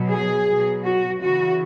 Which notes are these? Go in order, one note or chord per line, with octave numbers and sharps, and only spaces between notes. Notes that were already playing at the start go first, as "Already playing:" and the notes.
Already playing: B2 F#3
G#4
B2 F#3
F#4
C#3 E3 F#4